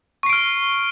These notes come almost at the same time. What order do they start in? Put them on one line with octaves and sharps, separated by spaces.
C#6 C7 D7 F6